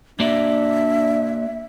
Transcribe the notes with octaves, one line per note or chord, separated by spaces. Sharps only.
A#3 D4 F#4 D5 E5